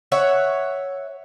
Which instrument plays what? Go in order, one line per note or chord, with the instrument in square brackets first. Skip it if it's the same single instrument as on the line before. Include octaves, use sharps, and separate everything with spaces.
[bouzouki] C#5 E5 F#5